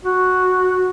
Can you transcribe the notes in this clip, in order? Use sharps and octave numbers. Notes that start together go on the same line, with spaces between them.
F#4